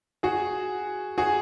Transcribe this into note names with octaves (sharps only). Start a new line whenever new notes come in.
F#4 G#4
F#4 G#4